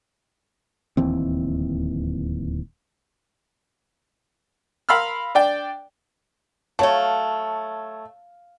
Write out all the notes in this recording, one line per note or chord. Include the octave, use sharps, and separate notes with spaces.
D1 D#2 E3 C4
A#4 F5 B5 C6 E6 F6
D4 D5 G5
F#3 A3 C#5 F5 A5